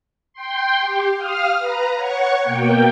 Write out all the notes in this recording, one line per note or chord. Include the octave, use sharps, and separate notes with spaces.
G5 C6
G4
F5 D#6 F6
B4 A#5
C#5 F#5 C#6
B2 A#3 G5